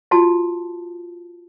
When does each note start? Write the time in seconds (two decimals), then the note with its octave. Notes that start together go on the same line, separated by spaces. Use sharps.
0.11 F4 F#4 A5